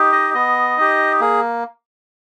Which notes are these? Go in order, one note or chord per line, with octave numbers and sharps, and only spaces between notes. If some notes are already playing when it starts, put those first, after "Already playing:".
Already playing: D#4 G4
D#5
B3 D#5
D#4 G4
A#3 G#4